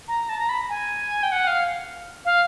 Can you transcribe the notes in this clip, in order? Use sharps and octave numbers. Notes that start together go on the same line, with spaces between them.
A#5
A5
A#5
B5
G#5
G5
F#5
F5
F5